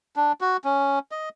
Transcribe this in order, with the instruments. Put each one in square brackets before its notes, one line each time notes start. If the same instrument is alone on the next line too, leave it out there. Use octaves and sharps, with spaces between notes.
[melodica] D4
F#4
C#4
D#5